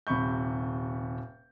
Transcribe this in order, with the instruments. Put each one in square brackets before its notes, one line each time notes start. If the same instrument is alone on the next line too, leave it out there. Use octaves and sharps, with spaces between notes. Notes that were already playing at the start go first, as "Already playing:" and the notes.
[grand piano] D#1 C3 B5 C#6 G6